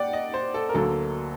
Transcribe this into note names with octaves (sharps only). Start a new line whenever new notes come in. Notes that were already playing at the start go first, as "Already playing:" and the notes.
Already playing: A#3 D5 F#5 G5
D#5
C5
A4
A#4
D2 D3 F#3 A#3 A4